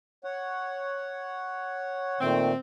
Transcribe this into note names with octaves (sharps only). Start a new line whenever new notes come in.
C#5 F#5
A#2 D#3 A3 C4